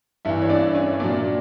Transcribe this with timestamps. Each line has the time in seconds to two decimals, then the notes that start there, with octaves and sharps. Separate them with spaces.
0.25 G2 E3 E4 E5
0.42 C#5
0.49 D4 D5
0.75 C#4 C#5
1.00 A#2 F#3 D4 D5